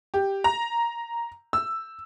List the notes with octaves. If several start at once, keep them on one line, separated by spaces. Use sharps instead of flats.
G4
A#5
E6